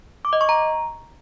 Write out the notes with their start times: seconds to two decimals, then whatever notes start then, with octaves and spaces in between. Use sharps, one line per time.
0.25 D6
0.33 D#5
0.41 C#6
0.49 A#5